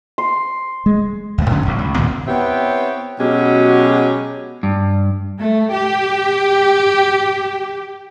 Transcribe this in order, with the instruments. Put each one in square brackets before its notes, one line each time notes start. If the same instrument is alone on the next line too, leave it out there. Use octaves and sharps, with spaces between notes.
[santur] C6
[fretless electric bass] G#3
[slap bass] D2 A3
G#2 D3 F#3 C#4
D1 A#1 E2
C#2
D#2 A#2 D#3 C4
[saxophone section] B3 C4 E4 G4 C#5
B2 F#3 G#3 C#4 G4
[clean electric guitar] G2
[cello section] A3
G4